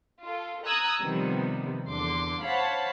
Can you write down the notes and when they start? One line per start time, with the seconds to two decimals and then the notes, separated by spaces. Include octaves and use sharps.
0.22 F4 A4
0.65 A#5 D#6 E6 F#6 G#6
1.00 C3 D#3 F3 G3 B3
1.88 E2 D3 C6 D6
2.43 C5 C#5 F5 F#5 A5 B5